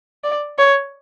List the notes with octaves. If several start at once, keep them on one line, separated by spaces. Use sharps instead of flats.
D5
C#5